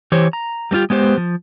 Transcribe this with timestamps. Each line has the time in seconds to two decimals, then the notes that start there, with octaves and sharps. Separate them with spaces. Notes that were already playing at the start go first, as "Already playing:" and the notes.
0.12 E3 G4 C5 C#5
0.33 A#5
0.71 G3 A#3 C#4 F4 G4
0.90 G#3 B3 G4 C5
1.18 F3